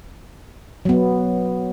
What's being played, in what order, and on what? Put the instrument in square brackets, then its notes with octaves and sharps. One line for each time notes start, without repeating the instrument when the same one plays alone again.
[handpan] F#3 B3